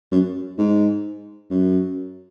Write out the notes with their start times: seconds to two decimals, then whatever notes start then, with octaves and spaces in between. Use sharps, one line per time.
0.11 F#2
0.58 G#2
1.50 F#2